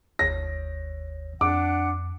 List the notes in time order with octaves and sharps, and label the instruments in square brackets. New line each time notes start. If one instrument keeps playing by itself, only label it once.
[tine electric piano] G1 D#2 C#5 [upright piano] A#6
[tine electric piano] F2 [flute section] D4 F#5 [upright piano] D6